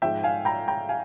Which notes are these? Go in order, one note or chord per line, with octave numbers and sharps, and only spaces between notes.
G#2 F3 E5 G5
F5 G#5
G5 A#5
G5 A#5
F5 G#5